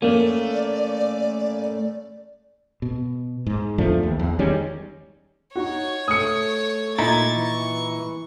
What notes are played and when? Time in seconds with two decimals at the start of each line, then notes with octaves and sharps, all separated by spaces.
0.02 A3 A#3 C#4 D5
2.82 B2
3.47 G#2
3.78 E2 F3 A3 D4
4.03 D#2
4.20 E2
4.39 D#3 G3 G#3 C#4
5.56 D#4 F#4 C#5
6.08 A3 D#6 C#7
6.98 A#2 D#4 E4 A#5 G#6 A6
7.35 E3 C#6